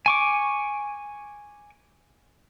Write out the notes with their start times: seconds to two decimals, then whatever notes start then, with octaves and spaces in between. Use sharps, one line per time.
0.06 G#5 C#6 D6